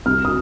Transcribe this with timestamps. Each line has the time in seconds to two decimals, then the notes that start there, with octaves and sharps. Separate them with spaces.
0.06 C2 F6
0.25 D#6